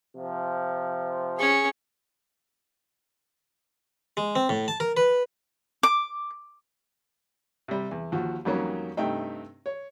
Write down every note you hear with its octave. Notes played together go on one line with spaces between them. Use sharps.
C3 F3
C#4 G#4 C#6
G#3
C4
A2
A5
A#4
B4
D6
C3 G3
E2
D#2 F3 F#4
F2 D#3 F#3 G3 A#3 C#4
G2 C3 A3 D#4 G5
C#5